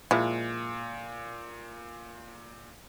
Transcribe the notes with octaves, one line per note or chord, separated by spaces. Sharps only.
A#2 F3 G#3 E4